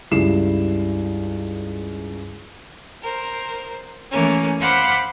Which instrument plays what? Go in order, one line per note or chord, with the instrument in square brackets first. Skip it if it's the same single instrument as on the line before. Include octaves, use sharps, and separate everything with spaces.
[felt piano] C#2 G2 E4 C7 E7
[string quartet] A#4 C5
E3 A3 A#3 C#4
C5 F5 F#5 B5 C6 D6